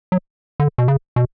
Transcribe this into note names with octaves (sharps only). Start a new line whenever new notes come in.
F#3
D3
B2
C#3
B2